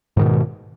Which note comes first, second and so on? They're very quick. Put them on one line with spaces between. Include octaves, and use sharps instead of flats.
G#2 D#3 B2